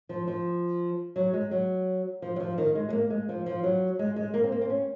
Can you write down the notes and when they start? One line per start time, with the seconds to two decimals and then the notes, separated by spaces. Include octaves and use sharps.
0.09 F3
0.27 F3
1.16 F#3
1.33 G#3
1.51 F#3
2.22 F3
2.36 F#3
2.40 F3
2.58 D#3
2.75 G#3
2.89 G#3
2.93 A#3
3.10 G#3
3.29 F3
3.46 F3
3.64 F#3
3.99 G#3
4.16 G#3
4.34 A#3
4.44 C4
4.52 A#3
4.61 C4
4.70 C#4